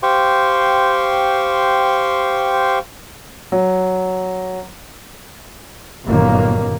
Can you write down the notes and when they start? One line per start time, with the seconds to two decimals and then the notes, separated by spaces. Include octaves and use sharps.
0.03 G4 C5 F5 G5 C6 C#6
3.52 F#3
6.07 G1 F#2 A#2 D#3 A#3